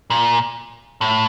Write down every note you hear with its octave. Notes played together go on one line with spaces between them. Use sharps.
A#2
A2